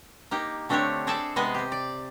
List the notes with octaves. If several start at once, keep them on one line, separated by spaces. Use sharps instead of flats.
A#3 D#4 G4
D3 A3 C4 D4 G4 C#5
C4 G#4 A4 D5 E5 A5
C3 G#3 B3 G#4 D#5
C4 G4
D5